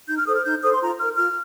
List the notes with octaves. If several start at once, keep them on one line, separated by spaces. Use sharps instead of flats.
D#4 G6
F6
A4 C5 D#6
F6
D#4 G6
A4 C5 D#6
C6
F4 A#5
A#4 F6
F4 F6